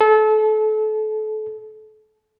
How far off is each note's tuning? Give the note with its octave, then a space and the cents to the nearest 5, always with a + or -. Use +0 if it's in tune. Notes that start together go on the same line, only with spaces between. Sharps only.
A4 -30